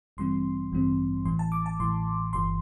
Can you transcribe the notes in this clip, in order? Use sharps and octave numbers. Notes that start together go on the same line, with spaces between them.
A1 G2 E3 G3 C4 C6
A1 G2 E3 G3 C4
A1 A2 E3 C6
A5
D6
A5
A1 A2 E3 C6
G1 G2 E3 C6